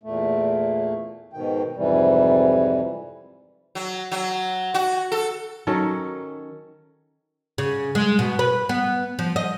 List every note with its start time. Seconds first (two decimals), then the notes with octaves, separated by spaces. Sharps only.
0.03 E2 A#2 A3
1.33 G#2 B2 D#3 G5
1.76 F2 G#2 C3 E3 G3
3.75 F#3
4.12 F#3
4.74 F#4
5.12 A4
5.67 D#3 F#3 C#4 A4
7.58 C#3
7.95 G#3
8.19 B2
8.39 B4
8.69 B3
9.19 F3
9.36 D#5